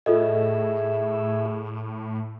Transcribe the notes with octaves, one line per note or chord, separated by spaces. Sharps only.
A2 F4 G#4 A4 D#5 E5